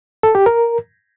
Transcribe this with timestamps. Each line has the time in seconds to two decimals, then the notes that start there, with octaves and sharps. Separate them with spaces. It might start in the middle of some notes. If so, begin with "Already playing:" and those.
0.23 A4
0.35 G4
0.46 A#4